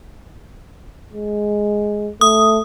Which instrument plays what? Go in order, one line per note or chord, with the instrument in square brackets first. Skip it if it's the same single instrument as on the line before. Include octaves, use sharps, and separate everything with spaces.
[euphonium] G#3
[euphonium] A3 [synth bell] D#6